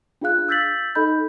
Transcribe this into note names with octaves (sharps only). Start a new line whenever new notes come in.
D4 F4 G#4 F5 F#6
E6 G6 A6 B6 F#7
D#4 A4 D#5 B5 G6